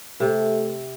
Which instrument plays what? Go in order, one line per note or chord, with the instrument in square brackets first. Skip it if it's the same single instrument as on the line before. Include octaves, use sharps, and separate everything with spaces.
[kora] C3 [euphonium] A3